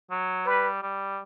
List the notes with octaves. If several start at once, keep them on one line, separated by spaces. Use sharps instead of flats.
F#3
G3 B4
G3